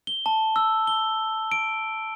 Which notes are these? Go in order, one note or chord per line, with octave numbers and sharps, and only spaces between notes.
G7
A5
E6
G7
D7